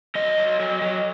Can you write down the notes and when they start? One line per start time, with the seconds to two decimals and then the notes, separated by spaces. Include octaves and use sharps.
0.15 F#3 D#5
0.38 F#3
0.60 F#3
0.82 F#3